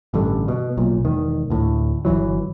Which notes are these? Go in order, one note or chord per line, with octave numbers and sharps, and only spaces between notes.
A1 G2 D3
B2
B1 A#2
E1 D#3
D2 A2
G1 F2 E3 F#3